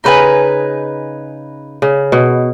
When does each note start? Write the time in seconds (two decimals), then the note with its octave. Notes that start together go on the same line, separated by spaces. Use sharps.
0.04 C#3 D#4 B4 G#5
1.82 C#3
2.12 B2